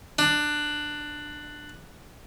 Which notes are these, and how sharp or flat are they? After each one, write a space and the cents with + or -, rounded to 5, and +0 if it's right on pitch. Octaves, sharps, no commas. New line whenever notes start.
D4 +15